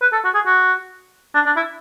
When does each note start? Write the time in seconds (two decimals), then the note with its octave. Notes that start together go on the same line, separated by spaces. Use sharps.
0.01 B4
0.12 A4
0.24 F#4
0.34 G#4
0.46 F#4
1.34 D4
1.46 D4
1.56 E4